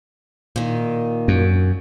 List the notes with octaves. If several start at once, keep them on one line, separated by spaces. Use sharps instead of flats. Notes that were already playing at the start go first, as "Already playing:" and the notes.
A#2 D#3
F#2